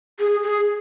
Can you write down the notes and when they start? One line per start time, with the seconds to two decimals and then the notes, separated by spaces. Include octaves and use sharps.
0.20 G#4
0.43 G#4